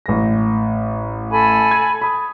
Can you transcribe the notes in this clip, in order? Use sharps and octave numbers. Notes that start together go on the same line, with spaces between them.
A1 A#6
A4 G#5 B5
G#6
B5 D#6